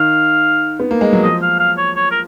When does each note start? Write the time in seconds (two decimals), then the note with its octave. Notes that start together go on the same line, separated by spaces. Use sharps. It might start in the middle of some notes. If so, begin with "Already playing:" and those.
Already playing: D#3 F5
0.80 B3
0.91 A#3
1.01 G#3
1.13 F#3
1.23 F3 D#5
1.42 F5
1.60 F5
1.78 C#5
1.96 C#5
2.11 A#4